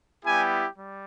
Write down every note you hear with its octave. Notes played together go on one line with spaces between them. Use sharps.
G3 B3 E4 G4 G#5
G3